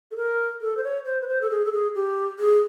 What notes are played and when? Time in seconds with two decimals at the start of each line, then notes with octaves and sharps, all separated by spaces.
0.11 A4
0.17 A#4
0.61 A4
0.77 C5
0.84 C#5
1.05 C5
1.21 B4
1.28 C5
1.41 A4
1.50 G#4
1.65 A4
1.72 G#4
1.95 G4
2.39 G#4